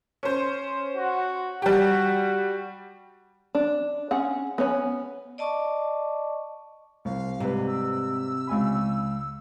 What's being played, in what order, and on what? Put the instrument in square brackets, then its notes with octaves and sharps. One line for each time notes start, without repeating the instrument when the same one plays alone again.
[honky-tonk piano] C#4 C5
[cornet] F#4
[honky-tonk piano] G3 G4 [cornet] F#4
[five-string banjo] D4
C#4 G#4 F#5
B3 C#4 C#5 G#5
[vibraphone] D5 D#5 A5 C#6 D6
[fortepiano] C2 [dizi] F5
[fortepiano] G#2 G3 B4 [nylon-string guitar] C3
[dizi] E6
[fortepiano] C#2 G#5 B5